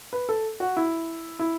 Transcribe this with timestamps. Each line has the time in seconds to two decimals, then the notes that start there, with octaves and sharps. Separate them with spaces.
0.13 B4
0.29 A4
0.60 F#4
0.77 E4
1.39 E4